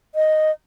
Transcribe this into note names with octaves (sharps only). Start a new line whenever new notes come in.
D#5